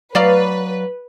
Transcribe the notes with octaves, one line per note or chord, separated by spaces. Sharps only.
F#3 B4 D5 F5